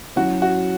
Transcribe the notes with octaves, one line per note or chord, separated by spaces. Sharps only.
F#3 C#4 E4 F#4
F#4